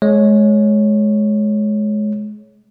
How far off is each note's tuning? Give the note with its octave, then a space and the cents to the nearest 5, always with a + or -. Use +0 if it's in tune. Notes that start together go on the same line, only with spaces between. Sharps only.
G#3 +25 C#5 +0